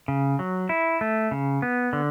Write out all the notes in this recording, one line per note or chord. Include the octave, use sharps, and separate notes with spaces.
C#3
F#3
E4
A3
C#3
B3
D3